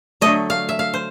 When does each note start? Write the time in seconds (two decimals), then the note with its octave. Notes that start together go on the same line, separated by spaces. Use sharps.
0.21 D3 F#3 A3 D#5
0.50 F5
0.69 E5
0.79 F5
0.94 C5